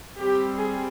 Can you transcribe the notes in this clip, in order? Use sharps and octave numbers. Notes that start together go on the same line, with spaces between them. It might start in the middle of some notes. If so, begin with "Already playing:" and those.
G3 C4 G4
G#4